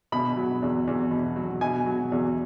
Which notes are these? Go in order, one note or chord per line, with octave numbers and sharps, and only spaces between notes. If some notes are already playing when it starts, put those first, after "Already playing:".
B2 B5
F#3
E2
E2
B2
F#3
B2 G#5
F#3
E2